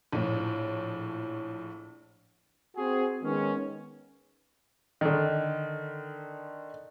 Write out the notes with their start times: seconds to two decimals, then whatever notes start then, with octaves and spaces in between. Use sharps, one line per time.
0.12 A#1 A2
2.76 C4 F#4 G#4
3.22 D#3 G#3 B3 C#4
5.01 D3 D#3